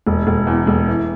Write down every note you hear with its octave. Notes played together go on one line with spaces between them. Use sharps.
E1
E1
E2
E1
E3